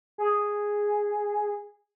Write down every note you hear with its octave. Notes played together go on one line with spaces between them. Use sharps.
G#4